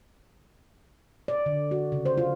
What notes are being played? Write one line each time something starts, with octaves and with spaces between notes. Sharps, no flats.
D5
D3
F#4
C#3
C5
F4